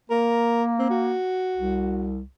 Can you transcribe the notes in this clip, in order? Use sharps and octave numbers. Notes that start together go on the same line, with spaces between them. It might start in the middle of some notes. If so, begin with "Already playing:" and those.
A#3 A#4
C4
F#4
C2